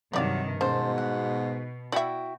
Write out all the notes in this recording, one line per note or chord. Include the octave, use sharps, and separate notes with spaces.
G2 C3 D#3 F#3 G3 D5 F5
G#2 B2 C#4 C5 A5
F#5
E4 F#4 D5 E5 G5